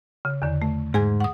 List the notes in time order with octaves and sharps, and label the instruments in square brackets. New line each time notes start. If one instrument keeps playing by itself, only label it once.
[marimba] C#3
E2 D3
A3
[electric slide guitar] G#2 [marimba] G#4 G#5 G#6
[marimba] F#5 D#6